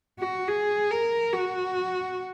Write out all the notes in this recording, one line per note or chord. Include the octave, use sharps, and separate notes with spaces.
F#4
G#4
A#4
F#4